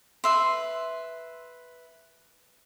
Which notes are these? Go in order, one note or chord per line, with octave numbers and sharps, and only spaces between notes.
B4 E5 C6